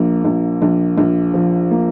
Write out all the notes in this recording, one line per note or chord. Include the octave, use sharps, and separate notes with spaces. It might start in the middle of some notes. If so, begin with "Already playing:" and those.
Already playing: A#1 A#3
A#1
A#1
A#1
F3
A#3